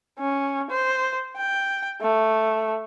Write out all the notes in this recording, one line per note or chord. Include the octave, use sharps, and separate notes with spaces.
C#4
C5
G5
A3